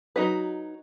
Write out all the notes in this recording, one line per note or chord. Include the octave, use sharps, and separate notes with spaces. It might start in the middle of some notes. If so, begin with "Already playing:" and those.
F#3 D#4 F#4 B4